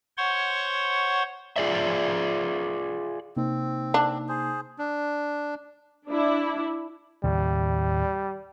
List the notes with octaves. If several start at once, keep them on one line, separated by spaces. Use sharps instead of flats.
C5 C#5 F#5 C6 C#6
F4 G#4 D5 E5
C3 A#3 C4 D#4
D4
G#4 C5
D4
D4 E4
D#2 A2 C#3 G3